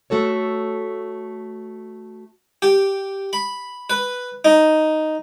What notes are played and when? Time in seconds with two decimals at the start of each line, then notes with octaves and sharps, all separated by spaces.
0.10 A3 F#4 A4 C#5
2.62 G4
3.33 B5
3.90 B4
4.45 D#4